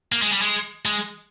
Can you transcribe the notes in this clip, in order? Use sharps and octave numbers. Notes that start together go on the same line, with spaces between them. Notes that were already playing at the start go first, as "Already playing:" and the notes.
A#3
G#3
G3
G#3
G#3